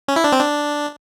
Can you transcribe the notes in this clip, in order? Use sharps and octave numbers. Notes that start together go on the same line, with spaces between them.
C#4
E4
D4
C4
D4